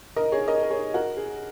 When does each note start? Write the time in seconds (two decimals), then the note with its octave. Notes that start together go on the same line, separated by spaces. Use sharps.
0.16 A#4 D#5
0.32 G#4 C#5
0.48 A#4 D#5
0.63 A#4
0.71 G#4 C#5
0.94 F#4 A#4
1.17 G#4